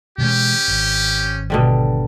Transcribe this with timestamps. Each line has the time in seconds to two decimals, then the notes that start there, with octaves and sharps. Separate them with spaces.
0.18 B2 E3 G#3 C#4 G4
0.68 G#1
1.50 B2 D3 G3